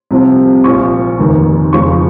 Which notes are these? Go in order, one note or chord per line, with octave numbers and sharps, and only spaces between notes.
C2 C3 F3
A#1 A#2 F3 C#6
F1 D#2 D#3
F1 F2 C#3 F3 C#6